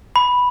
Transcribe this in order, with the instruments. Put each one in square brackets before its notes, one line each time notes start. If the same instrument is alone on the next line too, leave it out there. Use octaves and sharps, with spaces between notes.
[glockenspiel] B5